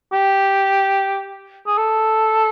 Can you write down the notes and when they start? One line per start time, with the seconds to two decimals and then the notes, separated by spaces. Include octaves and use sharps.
0.13 G4
1.66 G#4
1.78 A4